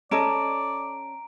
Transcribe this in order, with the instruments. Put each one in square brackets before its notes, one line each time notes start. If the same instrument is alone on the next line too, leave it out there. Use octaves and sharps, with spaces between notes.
[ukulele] C#4 A4 D#5 [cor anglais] D5 [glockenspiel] A#5 D7